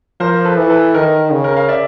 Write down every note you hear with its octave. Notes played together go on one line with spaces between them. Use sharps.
F3 A#4 C5
A4 B4
E3
A4 B4
D#3 A#4
C#3
A#4
F5
D5 E5